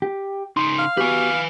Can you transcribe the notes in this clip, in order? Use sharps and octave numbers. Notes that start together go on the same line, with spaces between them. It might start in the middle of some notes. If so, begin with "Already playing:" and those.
G4
C#3 D#4 C6
F5
B3 F#4 G4 B4 G#5